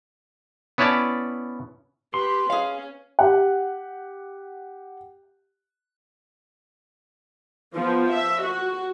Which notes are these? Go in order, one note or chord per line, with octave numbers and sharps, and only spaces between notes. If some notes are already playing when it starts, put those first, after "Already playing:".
B3 C#4 E4 C#5 D5 A5
G4 B4 C6
C#4 G#4 F5
G4 F#5
F3 B3
E5
F#4